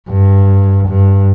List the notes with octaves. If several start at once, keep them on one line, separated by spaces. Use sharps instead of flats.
G2
G2